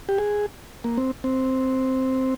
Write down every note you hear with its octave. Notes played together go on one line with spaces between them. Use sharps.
G4
G#4
A#3
C4
C4